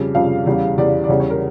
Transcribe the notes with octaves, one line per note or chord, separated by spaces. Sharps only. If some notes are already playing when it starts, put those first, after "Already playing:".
Already playing: F2 C#3 G3
F2 C#3 G3 F5
E2 C#3 G3
E2 C#3 G3 D5
D5
E2 C#3 G3 C#5
C#5
A#4